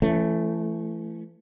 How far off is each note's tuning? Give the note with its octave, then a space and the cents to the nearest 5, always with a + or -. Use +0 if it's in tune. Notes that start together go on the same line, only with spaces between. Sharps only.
E3 +35 A3 +0 C#4 +0